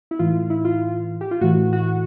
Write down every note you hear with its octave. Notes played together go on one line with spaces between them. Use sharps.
E4
A2 E3 F4
E4
F4
G4
F4
A2 E3 F#4
F#4